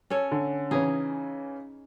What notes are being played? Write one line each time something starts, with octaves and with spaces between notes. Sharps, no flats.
C#4 A4 C#5
D3
C#3 E3 C#4 D#4 G#4